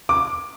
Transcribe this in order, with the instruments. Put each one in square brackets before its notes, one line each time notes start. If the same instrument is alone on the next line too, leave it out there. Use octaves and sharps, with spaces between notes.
[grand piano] D6